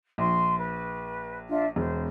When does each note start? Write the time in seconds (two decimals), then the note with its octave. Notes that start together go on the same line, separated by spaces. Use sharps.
0.18 A#1 C6
0.58 B4
1.48 D4 F4 E5
1.76 E1 C5